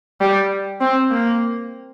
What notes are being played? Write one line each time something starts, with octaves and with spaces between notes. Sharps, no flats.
G3
C4
A#3